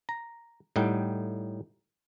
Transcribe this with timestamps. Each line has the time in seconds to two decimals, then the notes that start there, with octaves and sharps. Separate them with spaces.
0.09 A#5
0.76 A2 G3 D#4 F#5 G5